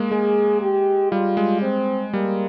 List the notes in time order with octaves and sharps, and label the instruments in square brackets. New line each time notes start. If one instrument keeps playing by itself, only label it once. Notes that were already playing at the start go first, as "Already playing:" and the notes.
Already playing: [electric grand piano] G#3 A#3
[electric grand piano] G#3 [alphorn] G#4
[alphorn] G4
[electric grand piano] G3 [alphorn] F4
[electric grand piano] G#3
[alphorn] C4
[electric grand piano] G3 [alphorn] A#3